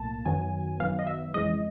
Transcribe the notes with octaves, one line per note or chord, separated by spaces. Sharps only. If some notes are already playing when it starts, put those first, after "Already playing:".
Already playing: B1 A2 A#3 A5
F#2 D#3 F#3 B3 G#5
F#2 D#3 F#3 B3 F5
D#5
E5
F2 C#3 E3 G#3 D#5